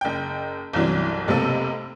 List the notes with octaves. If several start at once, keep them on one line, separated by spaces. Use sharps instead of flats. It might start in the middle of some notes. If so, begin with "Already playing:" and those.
F#1 G5
G1 C2 E3 F#3
F1 B1 C3 A#3 A4 E6